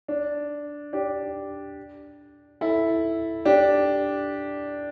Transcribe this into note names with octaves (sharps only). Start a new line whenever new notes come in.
D4
D4 G4
E4 A4
D4 G4